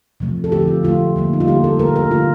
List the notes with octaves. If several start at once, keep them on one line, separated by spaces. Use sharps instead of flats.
C3 F3 A3
A4
D3 F3 A3 G4
F4
D3 F3 A3 F4
D3 G3 A#3
D#4
F4
D3 G3 A#3 G4
A4
D3 A3 A#4
A#4
D3 A3 F4